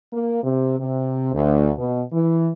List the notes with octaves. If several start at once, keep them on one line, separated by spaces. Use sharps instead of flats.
A#3
C3
C3
D2
B2
E3